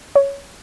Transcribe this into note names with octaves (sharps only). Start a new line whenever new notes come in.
C#5